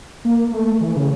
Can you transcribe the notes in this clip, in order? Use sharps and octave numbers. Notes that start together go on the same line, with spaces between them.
A#3
A3
E3
C#3